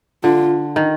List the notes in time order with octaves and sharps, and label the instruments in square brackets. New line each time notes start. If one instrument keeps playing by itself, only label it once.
[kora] D3 [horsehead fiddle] F4
[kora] D#3